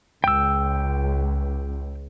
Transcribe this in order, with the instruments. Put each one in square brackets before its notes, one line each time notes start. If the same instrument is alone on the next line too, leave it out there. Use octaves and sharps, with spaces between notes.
[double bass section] C#2 [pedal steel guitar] G5 E6